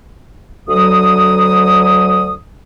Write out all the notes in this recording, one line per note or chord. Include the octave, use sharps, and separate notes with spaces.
D2 F#3 D#6